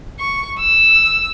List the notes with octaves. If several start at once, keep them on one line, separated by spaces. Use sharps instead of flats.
C#6
E6